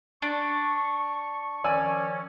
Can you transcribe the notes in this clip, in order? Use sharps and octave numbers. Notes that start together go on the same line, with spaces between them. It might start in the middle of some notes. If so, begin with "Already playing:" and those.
D4 C#6
D#3 F3 C#4 D5 G#5 E6